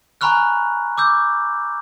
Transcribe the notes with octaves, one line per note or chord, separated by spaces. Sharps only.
G#5 A#5 B5 C#6 F6 F#6
D6 E6 G6